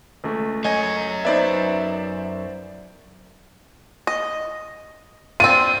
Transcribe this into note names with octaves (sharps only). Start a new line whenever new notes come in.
C#2 A3
F#2 C#5 D#5 G#5
B3 D#4 C5 D5 E5
D#5
C4 D4 F4 D#7